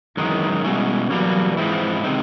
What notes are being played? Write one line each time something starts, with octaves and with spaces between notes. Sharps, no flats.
F#2 D#3 E3 G#3
B2 G3 G#3 C#4 E4
E2 B2 F#3 G3 A#3
G#2 E3 F3 G#3 C4 E4
C3 D#3 G#3 C4 D#4